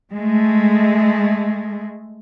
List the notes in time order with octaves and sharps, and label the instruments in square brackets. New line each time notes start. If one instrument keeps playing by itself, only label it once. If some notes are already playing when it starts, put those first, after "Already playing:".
[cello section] G#3 A3